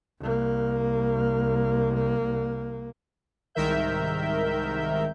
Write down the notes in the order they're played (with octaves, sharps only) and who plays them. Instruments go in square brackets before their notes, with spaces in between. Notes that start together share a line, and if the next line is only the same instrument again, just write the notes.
[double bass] C2 A#3
[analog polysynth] C2 G#2 D#3 A#4 E5 G6